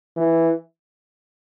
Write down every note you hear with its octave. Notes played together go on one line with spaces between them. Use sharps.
E3